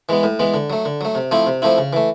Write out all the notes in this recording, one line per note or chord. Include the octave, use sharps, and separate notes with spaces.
E3 G#3 B3
A2
E3 G#3 B3
D3
F#3 A3
D3
F#3 A3
C3
F3 A3 C4 E4
C3
F3 A3 C4 E4
C#3
E3 A3